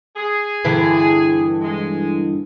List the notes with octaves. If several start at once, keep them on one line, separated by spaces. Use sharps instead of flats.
G#4
G2 D3 E3
G#3